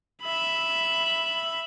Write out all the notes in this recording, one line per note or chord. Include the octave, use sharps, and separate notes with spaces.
E5 B5